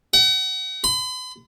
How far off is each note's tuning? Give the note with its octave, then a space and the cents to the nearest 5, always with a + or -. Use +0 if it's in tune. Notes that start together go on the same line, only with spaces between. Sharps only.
F#5 +40
B5 +45